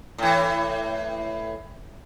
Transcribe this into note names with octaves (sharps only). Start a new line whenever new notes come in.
A2 E3